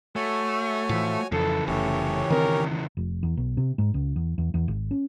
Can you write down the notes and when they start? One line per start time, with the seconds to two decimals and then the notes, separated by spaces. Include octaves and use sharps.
0.16 A3 F#4 C#5 G#5
0.89 A2 E3 F3
1.32 F2 C#3 E3 A4
1.68 F1 A3 C#4 G4 C#5
2.30 D#3 C4 A#4
2.97 F1
3.23 E2
3.37 B1
3.57 C3
3.78 G#2
3.94 C#2
4.16 E2
4.38 E2
4.54 E2
4.68 G#1
4.91 C#4